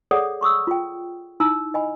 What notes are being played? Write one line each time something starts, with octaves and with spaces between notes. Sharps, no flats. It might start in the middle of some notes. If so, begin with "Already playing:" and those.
G#4 A4 C#5 D5 F#5 D#6
C6 C#6 D#6 E6
F4 G5
D#4 E4 A#5 E6
D#5 G#5 B5